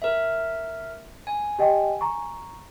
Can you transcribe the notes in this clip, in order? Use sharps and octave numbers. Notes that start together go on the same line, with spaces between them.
A#4 E5
G#5
G4 D#5 G5
A#5 C#6